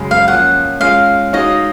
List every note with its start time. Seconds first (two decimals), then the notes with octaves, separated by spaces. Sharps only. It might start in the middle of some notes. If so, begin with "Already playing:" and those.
Already playing: F#2 C#3 G#3
0.11 F5
0.28 F3 A#3 C#4 F4 F#5
0.81 G#3 C#4 F4 F5
1.33 G#3 D#4 F#4 C#5 D#5 F5